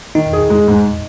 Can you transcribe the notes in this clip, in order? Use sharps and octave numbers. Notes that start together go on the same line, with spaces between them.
D#3 D#4
G#4
G#3
G#2